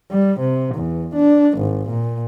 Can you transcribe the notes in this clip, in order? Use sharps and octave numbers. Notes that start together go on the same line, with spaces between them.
G3
C3
E2
D4
G#1
A#2